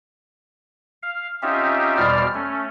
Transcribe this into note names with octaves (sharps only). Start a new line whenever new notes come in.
F5
C4 C#4 D#4 F4 G4 E5
E2 B2 G3 C5 D5 F6
A3 C#4